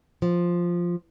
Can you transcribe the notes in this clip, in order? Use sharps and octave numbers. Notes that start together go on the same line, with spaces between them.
F3